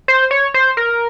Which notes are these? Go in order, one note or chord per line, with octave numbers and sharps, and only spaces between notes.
C5
C#5
C5
A#4